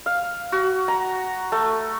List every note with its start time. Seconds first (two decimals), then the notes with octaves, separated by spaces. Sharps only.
0.06 F5
0.52 F#4
0.88 A#5
1.52 A3